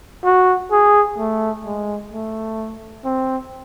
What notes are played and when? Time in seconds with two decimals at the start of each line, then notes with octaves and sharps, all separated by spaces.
0.25 F#4
0.71 G#4
1.19 A3
1.65 G#3
2.12 A3
3.04 C4